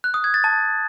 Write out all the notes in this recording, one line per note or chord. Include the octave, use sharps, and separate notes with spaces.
F#6
D#6
G#6
A6
A5